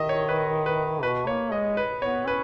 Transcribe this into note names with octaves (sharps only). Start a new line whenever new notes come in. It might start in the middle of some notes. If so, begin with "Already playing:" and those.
Already playing: D#3 D#5 E5
C#5
B4
B4
B2 B4
A#3 C#5
G#3 D#5
B4
B3 C#5
C#4 B4